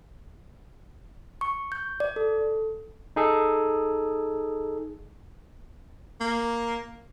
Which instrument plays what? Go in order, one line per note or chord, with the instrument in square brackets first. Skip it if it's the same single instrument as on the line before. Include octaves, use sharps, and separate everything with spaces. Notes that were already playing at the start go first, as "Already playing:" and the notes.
[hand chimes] C#6
G6
D5
A4
[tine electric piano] D#4 G#4 A4
[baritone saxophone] A#3